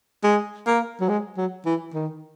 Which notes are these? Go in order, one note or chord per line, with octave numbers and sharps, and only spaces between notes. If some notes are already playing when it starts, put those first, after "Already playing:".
G#3
A#3
F#3
G#3
F#3
E3
D#3